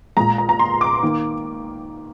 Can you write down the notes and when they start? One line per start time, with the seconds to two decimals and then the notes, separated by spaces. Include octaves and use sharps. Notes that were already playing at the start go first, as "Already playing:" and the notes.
0.17 A#2 G#3 A#5
0.38 A#5
0.49 A#5
0.59 C6
0.81 D6
1.03 D#3 A#3